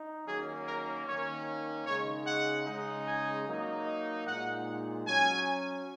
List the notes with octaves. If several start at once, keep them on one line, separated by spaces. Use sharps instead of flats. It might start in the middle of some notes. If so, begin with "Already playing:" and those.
Already playing: D#4
D#3 F#3 A#3 C#4 G#4
A#4
D#3 A#3 C#4 C#5
C#3 G#3 D#4 C#5
F#5
C#3 G#3 D#4
G#5
F#3 A#3 D#4
D#5
A#2 G#3 D#4 F#5
F#3 C#4 G#5